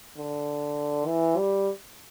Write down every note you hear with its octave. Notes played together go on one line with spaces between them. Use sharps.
D3
E3
G3